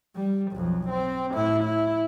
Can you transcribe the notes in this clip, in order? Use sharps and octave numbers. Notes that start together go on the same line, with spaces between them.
G3
B1 F2
C4
A2 E4
E4